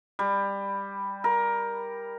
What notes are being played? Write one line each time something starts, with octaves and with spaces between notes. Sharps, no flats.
G3
A#4